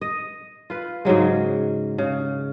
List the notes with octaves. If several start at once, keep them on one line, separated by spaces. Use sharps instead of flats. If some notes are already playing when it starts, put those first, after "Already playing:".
D#5
F4 B4
G#2 C#3 F#3 G#3
C#3